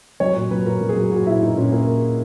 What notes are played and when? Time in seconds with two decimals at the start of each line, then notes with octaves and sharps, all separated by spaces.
0.20 F#3 C#5
0.36 A#2
0.51 F#3 B4
0.66 A#2 A#4
0.81 F#3
0.89 G#4
0.96 F#3
1.11 A#2 F#4
1.27 A#2 E4
1.41 A#2 D#4
1.57 A#2 C#4
1.72 A#2 A#3